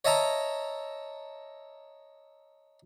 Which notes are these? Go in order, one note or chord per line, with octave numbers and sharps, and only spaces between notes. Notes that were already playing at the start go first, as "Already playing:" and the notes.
C#5 D#5 E5 A5 A#5